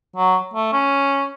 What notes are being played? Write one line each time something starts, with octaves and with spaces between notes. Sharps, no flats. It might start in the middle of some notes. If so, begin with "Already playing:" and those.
F#3
A3
C#4